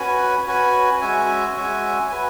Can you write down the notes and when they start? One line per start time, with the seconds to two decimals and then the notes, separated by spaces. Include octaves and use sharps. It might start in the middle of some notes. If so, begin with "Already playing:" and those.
Already playing: C#4 F#4 B4 G#5
0.46 C#4 F#4 B4 G#5
1.01 G#3 C#4 F#4 E5 G#5
1.55 G#3 C#4 F#4 E5 G#5
2.10 F#4 B4 G#5